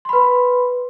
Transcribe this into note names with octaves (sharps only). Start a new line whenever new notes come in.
B4 B5 C6